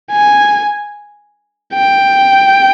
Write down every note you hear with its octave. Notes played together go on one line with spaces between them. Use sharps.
G#5
G5